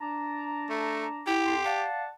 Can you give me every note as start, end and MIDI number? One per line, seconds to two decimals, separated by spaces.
0.01 1.26 62
0.01 1.26 81
0.01 1.26 82
0.69 1.06 57
1.27 1.55 64
1.27 1.83 67
1.44 1.59 41
1.44 1.59 81
1.44 1.59 84
1.64 2.08 74
1.64 2.03 77
1.64 2.08 78
1.64 2.08 81